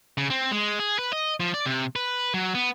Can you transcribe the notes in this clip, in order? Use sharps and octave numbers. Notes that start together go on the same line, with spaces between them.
C#3
C4
G#3
G#4
B4
D#5
F3
D5
C3
B4
F#3
B3